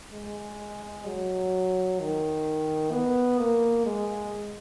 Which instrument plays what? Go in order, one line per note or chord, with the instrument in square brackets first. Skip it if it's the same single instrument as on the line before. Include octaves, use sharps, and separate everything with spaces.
[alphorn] G#3
F#3
D#3
B3
A#3
G#3